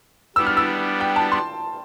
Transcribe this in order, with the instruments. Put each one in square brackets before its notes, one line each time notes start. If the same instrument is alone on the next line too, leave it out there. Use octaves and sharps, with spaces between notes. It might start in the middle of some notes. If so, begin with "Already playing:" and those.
[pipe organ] G3 B3 D4 [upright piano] E6
[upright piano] F6
E6
G5
A5
C6